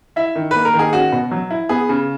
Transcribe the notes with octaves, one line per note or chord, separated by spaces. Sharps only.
E4 E5
D#3
A#3 B4
A#4
D#3
G#4
C#4 F#4
B2
F#3
E4
B3 G#4
C#3